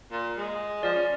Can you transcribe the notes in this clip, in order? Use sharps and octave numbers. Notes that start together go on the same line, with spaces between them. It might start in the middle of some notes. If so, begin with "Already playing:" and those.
A#2
G#3
F3 D5
C#4